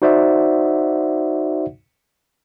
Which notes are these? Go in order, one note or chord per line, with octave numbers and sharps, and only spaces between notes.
D#4 F#4 C5 D5 E5 F#5